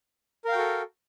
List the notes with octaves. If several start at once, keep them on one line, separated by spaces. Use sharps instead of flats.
F#4 A4 A#4 F5 G5